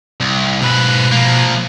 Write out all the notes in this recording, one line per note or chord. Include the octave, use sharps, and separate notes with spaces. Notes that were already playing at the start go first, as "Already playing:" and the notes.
C2
G#2 B2 B4
F3 A#3